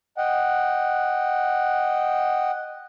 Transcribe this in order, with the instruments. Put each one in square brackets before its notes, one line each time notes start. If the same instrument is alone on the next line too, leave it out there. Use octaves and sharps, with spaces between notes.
[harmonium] D#5 F#5 G5